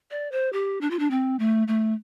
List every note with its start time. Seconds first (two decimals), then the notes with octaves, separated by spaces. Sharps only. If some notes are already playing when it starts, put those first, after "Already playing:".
0.11 D5
0.32 C5
0.53 G4
0.81 D4
0.90 F4
0.99 D4
1.10 C4
1.39 A3
1.68 A3